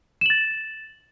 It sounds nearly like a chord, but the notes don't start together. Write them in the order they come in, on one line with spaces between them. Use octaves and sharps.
E7 F#7 A6